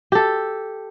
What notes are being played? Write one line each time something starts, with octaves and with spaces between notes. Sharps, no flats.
G4 A4